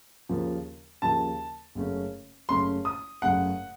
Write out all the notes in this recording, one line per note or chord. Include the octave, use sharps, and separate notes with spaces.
D#2 C#3 F3 A#3
D#2 C#3 F3 A#3 A5
F#1 F#2 C#3 A3 C#4
F#1 F#2 C#3 A3 C#4 C6
D#6
F#1 F#2 C#3 A3 C#4 F#5